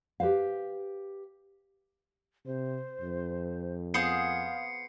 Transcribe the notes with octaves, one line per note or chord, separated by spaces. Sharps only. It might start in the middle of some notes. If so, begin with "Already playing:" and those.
G4 B4 C5 F5
C3 C5
F2
B3 G#4 C5 F5 C7 C#7